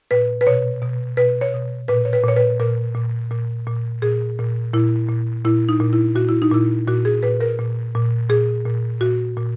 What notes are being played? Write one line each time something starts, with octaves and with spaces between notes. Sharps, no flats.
A#2 B4
B4
B2 C#5
B2
B2 B4
C#5
B2
A#2 B4
C#5
B4
A#2 C#5
B4
A#2 A#4
A#2
A#2
A#2
A#2 G#4
A#2
A#2 E4
A#2
A#2 E4
D#4
A#2
E4
A#2 F#4
E4
D#4
A#2 E4
A#2 F#4
G#4
A#2 B4
A#4
A#2
A#2
A#2 G#4
A#2
A#2 F#4
A#2